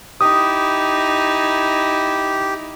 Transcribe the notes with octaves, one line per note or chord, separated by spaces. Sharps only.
D#4 E4 G4 D#6